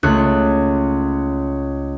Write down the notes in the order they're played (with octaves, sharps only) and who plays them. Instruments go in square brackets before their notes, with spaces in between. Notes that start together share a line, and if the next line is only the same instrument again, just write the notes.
[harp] C#2 A3 F#6